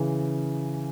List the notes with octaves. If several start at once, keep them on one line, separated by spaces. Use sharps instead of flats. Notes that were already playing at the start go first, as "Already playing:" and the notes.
Already playing: C#3 E3